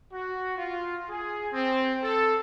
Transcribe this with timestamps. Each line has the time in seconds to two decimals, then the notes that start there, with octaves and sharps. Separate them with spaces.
0.12 F#4
0.57 F4
1.09 G#4
1.53 C4
2.03 A4